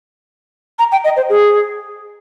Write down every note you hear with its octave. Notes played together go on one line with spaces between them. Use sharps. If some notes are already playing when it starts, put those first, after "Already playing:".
A#5
G5
D#5
C5
G#4